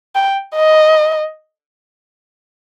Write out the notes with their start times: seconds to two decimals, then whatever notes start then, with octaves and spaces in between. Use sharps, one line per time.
0.15 G5
0.55 D#5